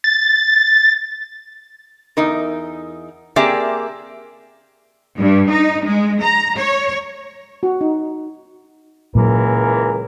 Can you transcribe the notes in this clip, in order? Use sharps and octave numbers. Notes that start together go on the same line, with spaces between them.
A6
E2 D#4 A#4
A#3 C4 G4 G#4 D5 E5
G2
D#4
G#3
A#5
C#5
F#4
D#4
C#2 A#2 E3 F#3 A#4